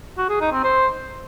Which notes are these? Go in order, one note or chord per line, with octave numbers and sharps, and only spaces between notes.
F#4
G#4
D#4
C4
C5